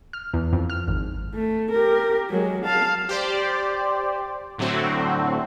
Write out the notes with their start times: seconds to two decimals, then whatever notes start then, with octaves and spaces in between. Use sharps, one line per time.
0.13 F6
0.34 E2
0.53 F2
0.70 F6
0.88 G#1
1.35 A3
1.72 G4 A#4
2.30 F#3 G#3
2.65 F5 A5
3.09 G4 C5 D5
4.58 A2 D3 F#3 A3 C4 F#4